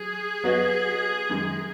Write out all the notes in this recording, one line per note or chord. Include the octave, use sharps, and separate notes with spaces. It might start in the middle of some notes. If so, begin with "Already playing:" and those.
Already playing: F#3 G#4
F#3 B3 F#4 B4 D#5
F#2 D#3 G#3